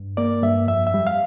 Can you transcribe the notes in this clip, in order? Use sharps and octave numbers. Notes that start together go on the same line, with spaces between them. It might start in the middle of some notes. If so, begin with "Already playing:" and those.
Already playing: G2
A#3 D5
G2 E5
F2 E5
E5
G3
F5